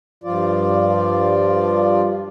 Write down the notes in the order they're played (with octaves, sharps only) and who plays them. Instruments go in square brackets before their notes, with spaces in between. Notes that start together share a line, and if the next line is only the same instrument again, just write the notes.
[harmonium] G2 F3 F4 D5